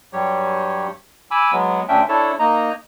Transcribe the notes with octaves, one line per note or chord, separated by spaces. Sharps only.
G2 F#3 G3 G4 C#5
G#5 B5 D6 E6
F#3 G#3 B3
D2 C#4 D4 E5 G5
D4 E4 A4 C#5 A5
A#3 D#4 D#5 A#5